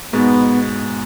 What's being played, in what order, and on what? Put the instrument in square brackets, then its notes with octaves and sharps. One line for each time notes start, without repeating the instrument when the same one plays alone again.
[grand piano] G#2 B2 [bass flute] B3